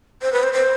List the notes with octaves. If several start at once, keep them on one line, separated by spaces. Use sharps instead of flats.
C5
B4
C5
C5